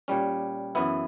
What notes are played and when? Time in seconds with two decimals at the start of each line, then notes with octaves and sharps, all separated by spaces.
0.08 A#2 G3 C#4
0.75 F#2 E3 B3 E4